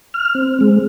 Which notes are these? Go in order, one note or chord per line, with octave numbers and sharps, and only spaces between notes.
F6
C4
G#3